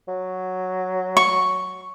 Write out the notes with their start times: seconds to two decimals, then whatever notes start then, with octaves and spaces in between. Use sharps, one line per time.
0.08 F#3
1.17 C#6